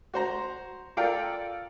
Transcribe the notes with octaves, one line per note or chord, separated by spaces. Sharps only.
F#4 C5 A#5
F4 A4 A#4 D5 F5 G5